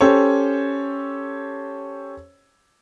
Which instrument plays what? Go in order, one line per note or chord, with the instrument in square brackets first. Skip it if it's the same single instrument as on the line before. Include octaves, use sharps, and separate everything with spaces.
[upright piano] C#4 G4 A4 C5 C#5